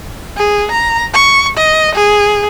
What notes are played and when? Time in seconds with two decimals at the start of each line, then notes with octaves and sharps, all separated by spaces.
0.37 G#4
0.71 A#5
1.14 C#6
1.56 D#5
1.95 G#4